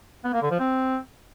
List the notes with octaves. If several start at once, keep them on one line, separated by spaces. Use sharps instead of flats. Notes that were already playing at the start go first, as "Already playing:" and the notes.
B3
A#3
D3
F3
C4